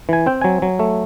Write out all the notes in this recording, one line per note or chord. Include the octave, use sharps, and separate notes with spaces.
E3 G#5
C4 G5
F#3 G#5
F#3
A3